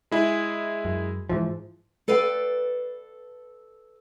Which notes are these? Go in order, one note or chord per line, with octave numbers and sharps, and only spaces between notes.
G#3 E4 G#4
F#2
G#2 E3 F3
A4 B4 D5 F5 G5